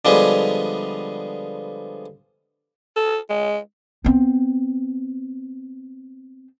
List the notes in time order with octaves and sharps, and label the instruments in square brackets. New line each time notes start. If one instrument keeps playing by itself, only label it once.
[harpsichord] D3 F3 G3 G#3 B3 G#4
[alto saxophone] A4
G#3
[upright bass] B3 C4